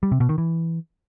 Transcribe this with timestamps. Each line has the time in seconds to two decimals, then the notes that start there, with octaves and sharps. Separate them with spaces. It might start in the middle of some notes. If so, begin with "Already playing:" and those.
0.03 G3
0.12 C3
0.20 B2
0.29 D#3
0.38 E3